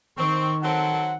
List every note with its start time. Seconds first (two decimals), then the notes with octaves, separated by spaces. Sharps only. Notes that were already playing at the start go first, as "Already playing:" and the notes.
0.18 D#3 C4 C#6
0.63 F#3 C4 A4 F#5